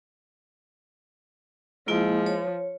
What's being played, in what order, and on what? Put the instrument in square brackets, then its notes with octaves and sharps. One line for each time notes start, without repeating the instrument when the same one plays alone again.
[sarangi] F3 [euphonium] G#3 [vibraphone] A#3 E4 F4
[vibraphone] C#5